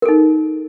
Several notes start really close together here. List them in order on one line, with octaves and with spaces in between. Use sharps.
A#4 A4 D#4